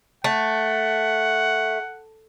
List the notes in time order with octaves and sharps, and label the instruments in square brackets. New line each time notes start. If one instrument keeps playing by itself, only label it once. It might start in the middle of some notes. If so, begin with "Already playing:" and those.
[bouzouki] A3 [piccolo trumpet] F#5